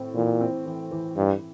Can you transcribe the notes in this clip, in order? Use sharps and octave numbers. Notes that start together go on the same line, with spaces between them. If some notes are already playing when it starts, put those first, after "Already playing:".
Already playing: A2 C4
A#2 E3
C4
E3
E3
G2 E4